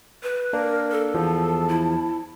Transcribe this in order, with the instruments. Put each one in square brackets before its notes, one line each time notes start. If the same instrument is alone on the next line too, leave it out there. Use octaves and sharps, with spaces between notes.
[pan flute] B4
[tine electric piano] A#3 D4 [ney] A#4
[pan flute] A4
[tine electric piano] E2 F3 [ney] A5
[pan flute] E4